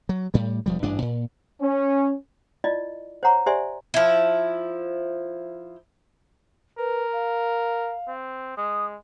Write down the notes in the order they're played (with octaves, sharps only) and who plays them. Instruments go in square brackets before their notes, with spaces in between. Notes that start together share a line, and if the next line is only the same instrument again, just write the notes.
[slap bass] F#3
A2 G3
E1 F3 G3
A1 G2 D4
A#2
[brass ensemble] C#4
[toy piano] E4 F4 D5 D#5
C5 C#5 F#5 A#5 C#6
G4 C5 D5 E5 G#5 C6
[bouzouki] F3 E4
[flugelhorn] A#4 [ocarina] B4
[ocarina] F5
[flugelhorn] C4
[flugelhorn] G#3 [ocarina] D#6